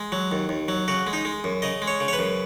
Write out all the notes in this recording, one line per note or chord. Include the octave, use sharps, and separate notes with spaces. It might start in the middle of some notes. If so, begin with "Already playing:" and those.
Already playing: G#3
F#3
D#2
D#2
F#3
C#3 F#4
G#3
D#4
G#3
F#2
C#3 D#5
G#3
C#5
C#3
C#5
B4
F#2